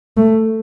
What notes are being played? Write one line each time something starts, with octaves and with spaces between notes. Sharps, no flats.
A3